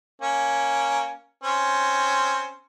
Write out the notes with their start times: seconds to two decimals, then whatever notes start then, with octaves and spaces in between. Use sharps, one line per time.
0.22 A#3 C#4
1.44 C4 C#4